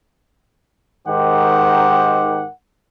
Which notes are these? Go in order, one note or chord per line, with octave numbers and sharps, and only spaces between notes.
G#2 D#3 C4 G4 F#5